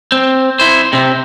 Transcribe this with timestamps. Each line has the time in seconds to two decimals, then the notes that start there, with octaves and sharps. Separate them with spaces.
0.12 C4
0.60 E4 C5
0.93 C3 C4